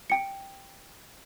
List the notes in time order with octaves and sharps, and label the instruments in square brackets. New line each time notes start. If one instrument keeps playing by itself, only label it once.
[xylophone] G5 C#7